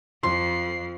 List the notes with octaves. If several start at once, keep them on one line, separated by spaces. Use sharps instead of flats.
F2 F3 C6 C7